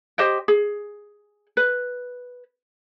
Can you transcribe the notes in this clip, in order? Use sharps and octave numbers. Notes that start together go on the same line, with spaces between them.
G4 C5 D#5 G5
G#4
B4